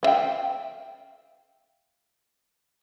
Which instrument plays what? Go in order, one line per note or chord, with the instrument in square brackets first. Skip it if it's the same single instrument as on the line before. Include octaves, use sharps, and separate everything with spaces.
[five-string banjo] B3 E5 F5 G5